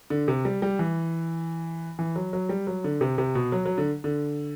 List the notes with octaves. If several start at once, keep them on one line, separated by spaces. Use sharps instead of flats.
D3
C3
G3
G3
E3
E3
F#3
F#3
G3
F#3
D3
C3
C3
B2
F#3
F#3
D3
D3